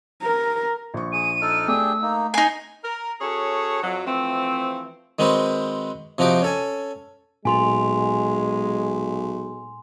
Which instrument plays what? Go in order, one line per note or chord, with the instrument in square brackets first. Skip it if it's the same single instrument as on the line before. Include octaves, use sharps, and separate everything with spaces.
[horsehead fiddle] A#4
[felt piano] A#1 C#6
[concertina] G#4 [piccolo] D#7
[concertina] D#4 A4 F6
[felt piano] A3 [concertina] D4 G4 G#4 [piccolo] E6
[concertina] A#3 D#4
[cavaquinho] D#4 G#5 [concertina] A#5 [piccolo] C7
[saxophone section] A#4
C#4 F#4 G#4 A4 C#5
F2 F#3
E3 F3 A3 C4
[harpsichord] D#3 G#3 C4 F#4 B4 C5
C3 F3 D#4 F#4 G4 D6
C#4 A4 G#5
[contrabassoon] B1 [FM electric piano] A#2 [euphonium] G#3 [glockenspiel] G#5 C6 F7